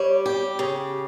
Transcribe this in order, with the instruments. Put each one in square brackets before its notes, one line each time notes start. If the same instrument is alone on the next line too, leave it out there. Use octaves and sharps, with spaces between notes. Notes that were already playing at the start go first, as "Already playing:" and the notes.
Already playing: [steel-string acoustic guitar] G3 [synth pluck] C#5
[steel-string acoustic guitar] G4
C#3